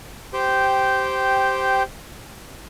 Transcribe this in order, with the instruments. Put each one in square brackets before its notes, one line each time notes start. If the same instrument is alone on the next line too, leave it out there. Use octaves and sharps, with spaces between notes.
[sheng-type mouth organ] G4 C5 G5